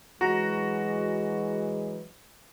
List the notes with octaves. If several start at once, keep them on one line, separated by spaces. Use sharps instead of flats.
E3 F#3 G#3 F#4 A#5